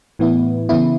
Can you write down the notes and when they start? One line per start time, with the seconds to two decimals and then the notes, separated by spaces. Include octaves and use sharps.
0.19 A2 E3 B3 E4
0.69 C#3 E3 B3 E4